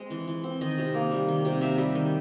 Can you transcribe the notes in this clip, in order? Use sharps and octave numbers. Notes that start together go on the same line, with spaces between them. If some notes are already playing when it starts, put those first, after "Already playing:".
Already playing: G#3 C4 D#5
E3
E3
C4
D#3 D#5
C3
A#3
G3
D#3
C3
A#3 E5
G3
D#3